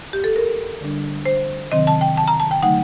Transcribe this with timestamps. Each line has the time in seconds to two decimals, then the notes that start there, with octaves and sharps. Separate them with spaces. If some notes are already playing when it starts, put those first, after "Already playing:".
0.13 G4
0.24 A4
0.36 A#4
0.81 D3 G3 D4
1.25 C5
1.71 C3 D#3 F#3 C4 D#5
1.87 A5
2.01 G5
2.17 A5
2.28 A#5
2.40 A5
2.51 G5
2.62 D3 F#3 A3 D#4 F#5